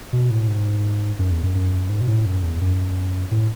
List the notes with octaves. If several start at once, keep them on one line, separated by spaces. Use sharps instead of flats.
B2
A2
G#2
F#2
E2
F#2
F#2
G#2
B2
A2
F#2
E2
F#2
A2